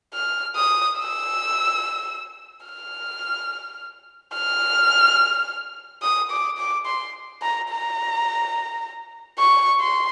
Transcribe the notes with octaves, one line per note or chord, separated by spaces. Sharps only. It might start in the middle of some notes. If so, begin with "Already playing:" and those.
F6
D#6
E6
F6
F6
D#6
D6
D6
C6
A#5
A#5
C#6
C6